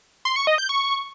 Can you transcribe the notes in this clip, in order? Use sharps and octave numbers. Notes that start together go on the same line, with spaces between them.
C6
C#6
D#5
G6
C#6